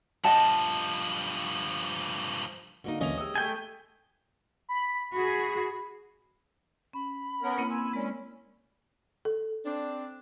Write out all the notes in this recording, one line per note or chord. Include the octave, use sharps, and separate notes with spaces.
G2 F3 D#5 F#5 A5
D3 A#3 D#4 F#4 F5
A1 D2 A#3 C#4 D#5 F7
G#3 G4 D#5 D#6 E6
A3 G5 G#5
B5
F#4 G#4 B5
C#4 B5
B3 C#4 A#4
A#3 C4 E4
G#5 C6 E6
G#3 C#4 A#4 D5
A4
C4 D4